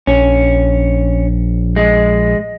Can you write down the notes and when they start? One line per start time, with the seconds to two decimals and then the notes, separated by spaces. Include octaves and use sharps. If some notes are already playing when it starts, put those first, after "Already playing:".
0.07 A#1 C#4
1.76 G#3